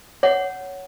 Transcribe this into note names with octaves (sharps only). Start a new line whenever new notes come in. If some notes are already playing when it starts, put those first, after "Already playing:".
C#5 F#5